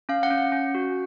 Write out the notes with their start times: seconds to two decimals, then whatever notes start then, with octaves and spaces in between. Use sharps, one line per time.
0.09 C#4 F5
0.23 F#5
0.30 C#4
0.38 F#5
0.52 C#4
0.75 F#4